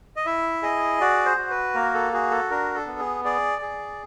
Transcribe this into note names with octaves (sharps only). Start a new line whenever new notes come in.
D#5
E4 E5
G#4 D#5
F#4 D5
C5
F#4
B4
A#3 A#4
A4
F#4 G#4
A4
D4 A#4
A4
B3
G#4
G#4 D5
G#4